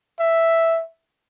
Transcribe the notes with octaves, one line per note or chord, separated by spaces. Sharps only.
E5